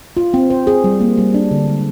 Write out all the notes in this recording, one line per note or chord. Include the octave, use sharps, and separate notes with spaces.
F4
C4
C5
G#4
G3
A#3
G3
D4
D3
G#3